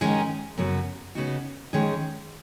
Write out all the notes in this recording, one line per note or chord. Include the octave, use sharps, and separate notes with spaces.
D#3 G#3 C#4 G#4
F#2 C#3 B3 F#4
C#3 B3 D#4 F#4
D#3 G#3 C#4 G#4 C#5